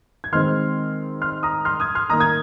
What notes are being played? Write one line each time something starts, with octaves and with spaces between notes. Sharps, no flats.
G#6
D#3 G#3 C4 C6 F6
C6 F6
A#5 D#6
C6 F6
D#6 G#6
C6 F6
D#3 A#3 A#5 D#6
D#6 G#6